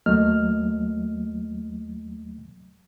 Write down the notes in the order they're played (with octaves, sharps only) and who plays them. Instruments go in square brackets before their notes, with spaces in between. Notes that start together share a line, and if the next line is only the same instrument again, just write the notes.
[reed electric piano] D#2 F#3 A3 A#3 D#5 F6